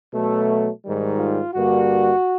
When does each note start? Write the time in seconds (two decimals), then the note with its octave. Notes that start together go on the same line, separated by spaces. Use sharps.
0.12 B2 F#3 A3
0.84 G#2 D#3 G3
1.19 F4
1.55 G2 D3 G3 A#3 F#4